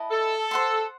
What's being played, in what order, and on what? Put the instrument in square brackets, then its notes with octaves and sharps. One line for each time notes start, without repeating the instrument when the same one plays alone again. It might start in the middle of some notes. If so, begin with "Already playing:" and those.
Already playing: [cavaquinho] E4 B4 D#5 A5
[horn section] A4
[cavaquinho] C5 F#5 C6